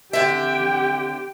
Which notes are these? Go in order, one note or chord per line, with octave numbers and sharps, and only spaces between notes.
D3 C4 G4 E5 G5